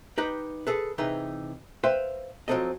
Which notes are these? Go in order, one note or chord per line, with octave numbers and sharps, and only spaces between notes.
D#4 G4 B4 D#5
G#4 A4 B4
C3 E3 D#4 G#4 B4
B4 C5 E5 F5 G5 C6
F3 F#3 A#3 C4 A4 D#5